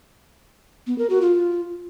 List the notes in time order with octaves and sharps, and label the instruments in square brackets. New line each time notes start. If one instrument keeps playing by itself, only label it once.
[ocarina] B3
A#4
F#4
F4